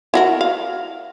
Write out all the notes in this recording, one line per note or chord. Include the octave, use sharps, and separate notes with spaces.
E4 F#4 A#4
F5